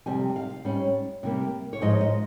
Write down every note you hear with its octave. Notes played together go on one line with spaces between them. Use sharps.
F2 C3 G3 G#5
F5
G#2 G3 C#4
C3 G3 A#3
C#5
G#2 F3 G#3 D#5
D#5